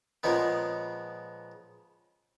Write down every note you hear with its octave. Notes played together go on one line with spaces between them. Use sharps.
A#2 C#3 F3 G#3 B3